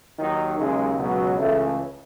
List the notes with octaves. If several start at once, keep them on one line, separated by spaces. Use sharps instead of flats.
D#2 D#3 F#3 D#4
D#2 C#3 F#3 G#3
C#2 B2 F#3
C#2 C#3 E3 A3